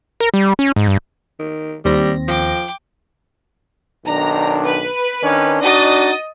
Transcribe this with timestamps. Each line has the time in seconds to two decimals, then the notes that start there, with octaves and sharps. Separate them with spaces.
0.20 A#4
0.34 G3
0.59 C#4
0.76 G#2
0.88 G2
1.39 D#3
1.85 D#2 G3 C4 A#6
2.28 F3 G5 D6
4.06 B1 D#3 D4 A#5
4.67 B4
5.23 D#3 C#4 D4
5.62 D4 D#4 F#4 D#5 D#6 A6